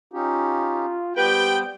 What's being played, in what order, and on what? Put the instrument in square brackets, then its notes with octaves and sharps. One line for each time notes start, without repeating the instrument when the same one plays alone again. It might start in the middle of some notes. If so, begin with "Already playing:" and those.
[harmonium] C#4 D#4 G4 [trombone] F4
[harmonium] G3 B3 C5 [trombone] G4 [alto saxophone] B4 [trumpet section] G5